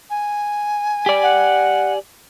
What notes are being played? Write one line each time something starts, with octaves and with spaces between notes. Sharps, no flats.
G#5
G4 D5
F#5